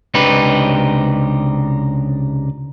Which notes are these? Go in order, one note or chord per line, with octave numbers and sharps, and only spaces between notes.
C#2 C3 D4 D#4 G4 B4